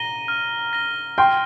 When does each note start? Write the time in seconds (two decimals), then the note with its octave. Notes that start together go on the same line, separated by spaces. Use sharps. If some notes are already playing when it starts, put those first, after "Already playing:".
Already playing: A#5 A#6 D#7 G7
0.28 F6
0.73 A#6 G7
1.18 G5 C6 F6